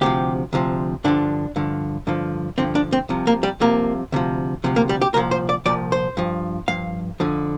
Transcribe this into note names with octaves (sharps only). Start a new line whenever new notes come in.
D2 C3 F3 G4
D2 C3 F3
G2 D3 F3 D4
G2 D3 F3
G2 D3 F3
G2 D3 F3 C4
D4
C4
C2 C3 F3
A#3
G3
C2 C3 F3 A#3
D2 C3 F3
D2 C3 F3
A#3
G3
G4
C2 A#2 F3 A#4
C5
D5
C2 A#2 F3 D5
C5
G2 F3
G2 F3 F5
F2 D3 F3